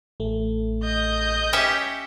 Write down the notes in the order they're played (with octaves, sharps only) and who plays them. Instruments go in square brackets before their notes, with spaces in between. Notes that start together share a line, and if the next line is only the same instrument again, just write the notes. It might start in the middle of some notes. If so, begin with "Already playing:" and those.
[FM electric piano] A1 A3
[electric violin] D#5 G6
[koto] C#4 G4 E5